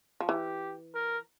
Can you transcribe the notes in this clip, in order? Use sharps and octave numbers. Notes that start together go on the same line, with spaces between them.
F3
E3 G4
A#4